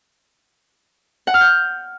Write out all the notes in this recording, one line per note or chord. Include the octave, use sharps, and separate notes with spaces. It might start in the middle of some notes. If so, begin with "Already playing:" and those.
F#5
F6
G6